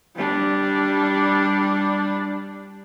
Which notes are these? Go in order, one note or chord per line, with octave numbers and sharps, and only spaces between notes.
G3 D4